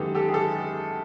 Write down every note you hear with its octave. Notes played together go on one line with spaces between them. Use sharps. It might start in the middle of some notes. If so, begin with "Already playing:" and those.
Already playing: F#2 D#3 G#3 B3 G4 A4
G4 A4
G#4
G4 A4